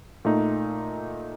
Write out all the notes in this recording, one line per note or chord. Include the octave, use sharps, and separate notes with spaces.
A#2 A3 D#4